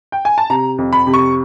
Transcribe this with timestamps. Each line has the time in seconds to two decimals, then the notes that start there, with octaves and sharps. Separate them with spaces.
0.12 G5
0.25 G#5
0.38 A5
0.50 C3 A#5
0.78 F2
0.93 B5
1.07 C3
1.14 C#6